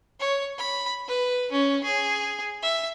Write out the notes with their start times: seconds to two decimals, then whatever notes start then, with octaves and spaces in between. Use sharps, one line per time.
0.20 C#5
0.58 B5
1.08 B4
1.52 C#4
1.84 G#4
2.62 E5